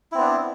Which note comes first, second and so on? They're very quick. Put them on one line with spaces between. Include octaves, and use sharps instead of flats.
E4 C4 B3 D4